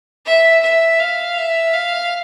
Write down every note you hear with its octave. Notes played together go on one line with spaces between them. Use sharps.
E5
E5
F5
E5
F5